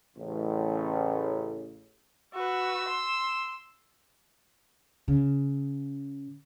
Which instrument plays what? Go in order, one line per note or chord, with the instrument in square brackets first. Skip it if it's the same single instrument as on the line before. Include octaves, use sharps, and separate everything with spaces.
[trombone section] A1 C#3
[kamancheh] F#4 B4 [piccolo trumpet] E6
[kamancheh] C6
[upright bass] C#3